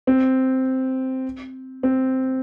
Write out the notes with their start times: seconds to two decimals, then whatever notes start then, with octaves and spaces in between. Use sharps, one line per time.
0.07 C4
1.83 C4